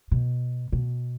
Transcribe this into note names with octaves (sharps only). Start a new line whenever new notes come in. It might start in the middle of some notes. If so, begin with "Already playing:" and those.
B2
B2